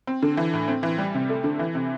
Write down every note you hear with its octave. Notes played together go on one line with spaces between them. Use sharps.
C4
D3
E3
A2
C4
E3
G3
C3
A3
D3
E3
C3